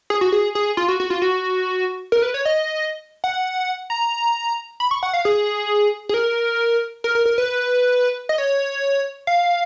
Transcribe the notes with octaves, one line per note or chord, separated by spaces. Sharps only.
G#4
F#4
G#4
G#4
F4
F#4
F#4
F4
F#4
A#4
B4
C#5
D#5
F#5
A#5
B5
C#6
F#5
F5
G#4
G#4
A#4
A#4
A#4
A#4
B4
D#5
C#5
F5